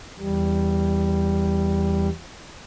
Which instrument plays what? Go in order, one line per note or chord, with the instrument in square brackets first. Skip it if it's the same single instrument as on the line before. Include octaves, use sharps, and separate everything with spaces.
[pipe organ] E2 G3